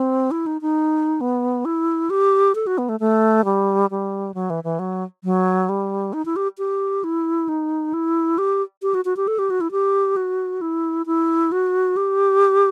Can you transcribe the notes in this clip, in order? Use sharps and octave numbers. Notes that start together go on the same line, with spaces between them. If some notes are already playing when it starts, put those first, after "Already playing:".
Already playing: C4
E4
D#4
D#4
B3
E4
G4
A4
F#4
B3
A3
A3
G3
G3
F#3
E3
E3
F#3
F#3
G3
D#4
E4
G4
G4
E4
D#4
E4
G4
G4
F#4
F#4
G4
A4
G4
F#4
E4
G4
F#4
E4
E4
F#4
G4